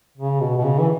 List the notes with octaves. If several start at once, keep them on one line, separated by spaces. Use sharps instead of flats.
C#3
B2
B2
C#3
E3